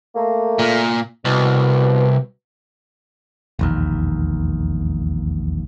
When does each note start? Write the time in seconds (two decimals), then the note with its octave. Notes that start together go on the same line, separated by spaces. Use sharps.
0.15 A3 A#3
0.59 A#2
1.25 C2 B2
3.59 E1 A#1 D#2